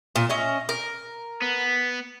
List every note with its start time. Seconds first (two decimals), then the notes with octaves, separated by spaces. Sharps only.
0.16 A#2
0.29 C#4 D#5 E5
0.69 A#4
1.42 B3